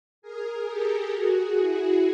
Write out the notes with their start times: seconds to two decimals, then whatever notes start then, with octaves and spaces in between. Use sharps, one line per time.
0.22 G#4 A#4
0.68 G4 A4
1.13 F#4 G#4
1.58 E4 F#4